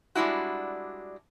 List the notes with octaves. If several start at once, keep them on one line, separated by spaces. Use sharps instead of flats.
G3 G#3 D4 E4 F#4